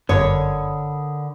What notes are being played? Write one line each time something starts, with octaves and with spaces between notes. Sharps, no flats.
G1 F#2 D3 A#4 C#5 B5 D#6